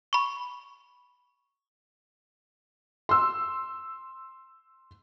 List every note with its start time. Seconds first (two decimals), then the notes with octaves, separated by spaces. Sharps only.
0.13 B5 C#6
3.09 C6 E6